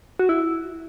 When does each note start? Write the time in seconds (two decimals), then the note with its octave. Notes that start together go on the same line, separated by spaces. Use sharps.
0.19 F#4
0.29 E4